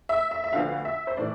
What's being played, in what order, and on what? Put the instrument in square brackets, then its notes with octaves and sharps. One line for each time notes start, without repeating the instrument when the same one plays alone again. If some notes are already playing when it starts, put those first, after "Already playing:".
[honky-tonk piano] E5
E5
E5
D2 D3 F3 B3 F5
E5
C5
A2 E3 A3 D5